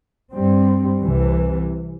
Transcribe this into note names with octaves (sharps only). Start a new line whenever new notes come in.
G2 G3 C4
C2 C3 E3